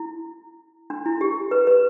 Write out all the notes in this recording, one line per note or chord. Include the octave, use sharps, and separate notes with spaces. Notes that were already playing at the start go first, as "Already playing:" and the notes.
Already playing: E4
D4
E4
G4
B4
B4